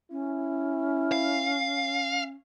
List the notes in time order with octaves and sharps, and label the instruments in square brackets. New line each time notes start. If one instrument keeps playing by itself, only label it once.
[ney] C#4 [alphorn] E4
[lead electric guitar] F5